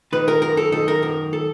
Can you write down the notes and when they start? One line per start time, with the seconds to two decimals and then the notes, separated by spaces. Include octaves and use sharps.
0.13 D#3 B4
0.28 A#4
0.42 F#2 A#4
0.57 A4
0.72 D#3 A4
0.88 A#4
1.02 F#2 A#4
1.33 A4